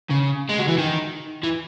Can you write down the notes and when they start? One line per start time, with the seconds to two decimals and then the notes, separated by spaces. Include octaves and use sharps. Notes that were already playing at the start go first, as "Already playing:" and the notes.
0.10 C#3
0.49 G#3
0.59 F#3
0.68 E3
0.78 D#3
1.44 E3